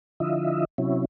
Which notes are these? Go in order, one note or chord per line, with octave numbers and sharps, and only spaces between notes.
D3 F3 E4 F4 D#5 E5
C3 F#3 C#4 E4